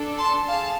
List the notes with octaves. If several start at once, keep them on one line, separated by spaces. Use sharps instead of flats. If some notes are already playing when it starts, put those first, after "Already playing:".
Already playing: D4 A4
A5 C6
G#4 F5 A5